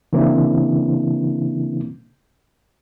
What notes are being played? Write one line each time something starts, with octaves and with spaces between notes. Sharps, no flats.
C#3 E3 A#3 C4 D4 E4